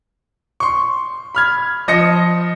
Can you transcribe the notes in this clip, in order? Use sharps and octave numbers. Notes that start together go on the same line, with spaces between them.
C6 C#6
B5 F6 G#6
F3 D#5 A#6 C#7